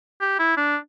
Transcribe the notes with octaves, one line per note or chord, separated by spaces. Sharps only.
G4
E4
D4